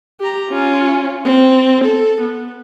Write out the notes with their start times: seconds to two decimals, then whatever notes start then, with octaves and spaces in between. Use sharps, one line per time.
0.20 G4 A#5
0.50 C#4 F4
1.25 C4
1.85 A4
2.22 B3